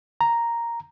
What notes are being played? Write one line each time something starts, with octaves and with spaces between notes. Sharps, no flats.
A#5